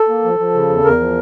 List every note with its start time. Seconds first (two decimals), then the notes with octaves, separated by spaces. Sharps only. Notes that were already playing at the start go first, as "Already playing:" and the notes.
Already playing: A4
0.09 A#3
0.24 F3
0.39 F3
0.54 C#3
0.69 E2
0.84 E2 A#4
1.00 F3